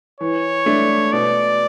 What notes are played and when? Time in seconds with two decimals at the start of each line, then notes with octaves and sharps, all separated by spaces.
0.20 E3 C#5
0.66 A3 D4
1.13 B2 D5